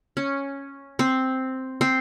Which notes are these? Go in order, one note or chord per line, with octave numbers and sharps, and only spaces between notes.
C#4
C4
C4